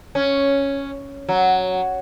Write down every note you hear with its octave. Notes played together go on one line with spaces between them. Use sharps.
C#4
F#3